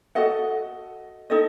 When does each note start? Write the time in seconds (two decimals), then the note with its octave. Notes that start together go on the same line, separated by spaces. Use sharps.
0.15 F#4 A4 D#5 F#5
1.30 D#4 A4 D#5